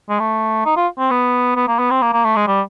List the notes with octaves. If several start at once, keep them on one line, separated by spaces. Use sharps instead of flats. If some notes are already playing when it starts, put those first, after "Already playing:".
G#3
A3
D#4
F4
C4
B3
B3
A#3
B3
C4
A#3
A#3
A3
G#3
G3